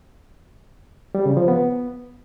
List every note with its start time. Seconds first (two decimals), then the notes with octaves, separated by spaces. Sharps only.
1.15 G3
1.26 C#3
1.37 F3
1.48 B3